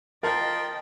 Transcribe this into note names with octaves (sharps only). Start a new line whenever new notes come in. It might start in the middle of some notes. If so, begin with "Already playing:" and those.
F3 A#4 D#5 G5 A6